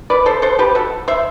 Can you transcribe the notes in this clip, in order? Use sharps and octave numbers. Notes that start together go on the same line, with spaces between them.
B4 D5
A4 C5
A4 C5
G4 B4
F#4 A4
C5 E5